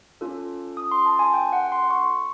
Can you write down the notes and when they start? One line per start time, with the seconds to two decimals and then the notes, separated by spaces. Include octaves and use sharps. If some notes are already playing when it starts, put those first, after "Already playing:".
0.21 C#4 F4 A4
0.77 D#6
0.91 C6
1.06 A5
1.19 G#5
1.34 G5
1.53 F#5
1.72 C6
1.91 C#6